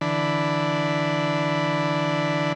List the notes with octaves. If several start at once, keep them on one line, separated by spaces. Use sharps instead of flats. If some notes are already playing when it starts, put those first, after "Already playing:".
D3 E3 D4 B5